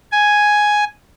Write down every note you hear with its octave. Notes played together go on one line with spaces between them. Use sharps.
G#5